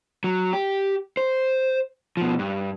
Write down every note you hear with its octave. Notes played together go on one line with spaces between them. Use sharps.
F#3
G4
C5
B2 F3
G2